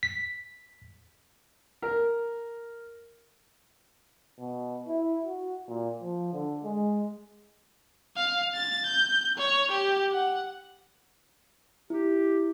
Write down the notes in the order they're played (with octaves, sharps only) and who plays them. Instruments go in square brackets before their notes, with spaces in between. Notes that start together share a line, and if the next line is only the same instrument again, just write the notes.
[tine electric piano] B6
[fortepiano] A#4
[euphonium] B2
E4
F#4
A#2
F3
D3
G#3
[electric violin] F5
A6
G6
C#5
G4
F#5
[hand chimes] E4 [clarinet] G4